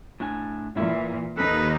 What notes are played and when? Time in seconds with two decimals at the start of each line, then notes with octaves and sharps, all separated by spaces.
0.20 A2 D4 G#5
0.76 A#2 E3 A#3 E4 E5
1.37 D#2 D#4 A4 B4